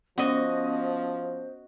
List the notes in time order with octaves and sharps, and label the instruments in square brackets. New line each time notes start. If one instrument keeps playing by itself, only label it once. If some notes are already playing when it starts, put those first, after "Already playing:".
[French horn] F3 [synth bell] B3 C#4 [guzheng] F#4 D#5 [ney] C5